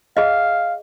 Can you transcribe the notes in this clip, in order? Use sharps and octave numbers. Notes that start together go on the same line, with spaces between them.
G#4 D#5 F5